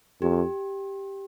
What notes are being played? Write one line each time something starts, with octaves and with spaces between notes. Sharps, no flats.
F2 G4